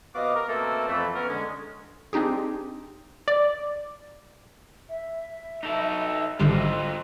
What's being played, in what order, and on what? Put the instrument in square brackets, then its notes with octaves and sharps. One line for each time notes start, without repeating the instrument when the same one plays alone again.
[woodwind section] C3 B3 F#4 D#5 F5 D6
A#4
B2 A3 A#3 C4 A4
F2 E3 A3
B3 C#4 A#4
D3 G#3 C#4
[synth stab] C4 D4 D#4 G4 G#4
D5
[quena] E5
[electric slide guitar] D#4 A4
[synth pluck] G#1 D3 G3 [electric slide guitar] F4 C5 D#5